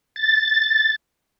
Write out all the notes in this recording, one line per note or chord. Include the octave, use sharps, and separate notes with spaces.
A6